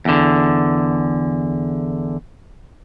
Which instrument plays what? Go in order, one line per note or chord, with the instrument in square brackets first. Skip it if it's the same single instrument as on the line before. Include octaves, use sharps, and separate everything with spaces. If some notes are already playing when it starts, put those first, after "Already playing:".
[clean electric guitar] E2 D3